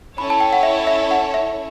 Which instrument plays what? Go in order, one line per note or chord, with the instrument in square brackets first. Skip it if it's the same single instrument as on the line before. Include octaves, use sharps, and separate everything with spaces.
[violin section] C#4 E4 A4 C#5 [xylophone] B5
[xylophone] A5
G5
F#5
E5
E5
F#5
E5